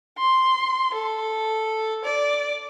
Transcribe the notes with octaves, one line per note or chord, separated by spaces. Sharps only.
C6
A4
D5